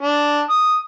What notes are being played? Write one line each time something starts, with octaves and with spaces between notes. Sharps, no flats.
D4
D#6